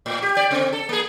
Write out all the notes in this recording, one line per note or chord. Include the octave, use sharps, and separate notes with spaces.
A2
G4
G4 D5
C#3 C4
A4
A#3 G#4